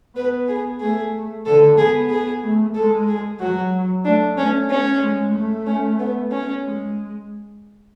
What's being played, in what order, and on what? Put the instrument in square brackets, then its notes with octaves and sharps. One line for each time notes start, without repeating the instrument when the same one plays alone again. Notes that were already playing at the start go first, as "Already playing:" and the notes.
[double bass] B3 [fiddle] B4
[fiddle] G#4
[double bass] A3 [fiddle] G#4
[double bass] D3 [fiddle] A4
[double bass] B3 [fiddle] G#4
[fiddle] G#4
[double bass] A3
[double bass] G#3 [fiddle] A4
[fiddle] G#4
[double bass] F#3 [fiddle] F#4
[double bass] A3 [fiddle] D4
[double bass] A3 [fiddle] C#4
[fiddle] C#4
[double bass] G#3
A3
[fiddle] C#4
B3
C#4
[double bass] G#3